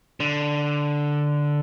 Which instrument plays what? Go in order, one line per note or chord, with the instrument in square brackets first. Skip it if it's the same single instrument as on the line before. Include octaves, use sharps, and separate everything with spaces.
[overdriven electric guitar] D3